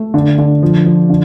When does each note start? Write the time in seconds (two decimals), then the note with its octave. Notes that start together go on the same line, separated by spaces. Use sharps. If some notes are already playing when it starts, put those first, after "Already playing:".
Already playing: A3
0.14 D3
0.38 D3
0.63 F3
0.86 F3
1.09 D3